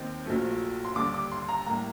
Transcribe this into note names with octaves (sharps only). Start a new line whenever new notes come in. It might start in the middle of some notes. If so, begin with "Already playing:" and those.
Already playing: D#2 D#3 C4
A#1 A#2 F#3 A3
C6
D#2 D3 G3 D6
D6
C6
A#5
A2 G3 A#3 A#5